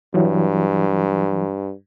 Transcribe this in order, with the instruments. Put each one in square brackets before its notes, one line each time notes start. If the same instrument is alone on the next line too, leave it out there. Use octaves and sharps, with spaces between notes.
[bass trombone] G2 [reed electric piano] E3 F#3